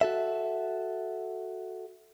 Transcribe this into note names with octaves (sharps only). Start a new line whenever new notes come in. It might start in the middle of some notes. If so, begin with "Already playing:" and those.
F#4 A4 E5